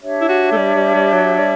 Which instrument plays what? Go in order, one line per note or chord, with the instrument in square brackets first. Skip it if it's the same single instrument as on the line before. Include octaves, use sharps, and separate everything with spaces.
[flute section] D4 G4 C#5 E5
[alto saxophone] E4
F#4
A3
G3
G3
G3
F#3
G3